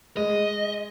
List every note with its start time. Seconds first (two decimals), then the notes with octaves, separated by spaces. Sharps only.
0.17 G#3 D#5